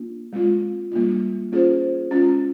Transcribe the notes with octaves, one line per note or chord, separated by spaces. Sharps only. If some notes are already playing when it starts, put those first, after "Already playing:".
Already playing: A#3 D4 F4
G#3 C4 F4
G3 A#3 D4 F4
A#3 C#4 F4 G#4 C5
G#3 C#4 F4